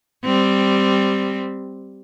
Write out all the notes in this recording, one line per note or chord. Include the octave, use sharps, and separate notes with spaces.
G3 C4